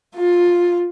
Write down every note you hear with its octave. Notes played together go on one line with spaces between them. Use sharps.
F4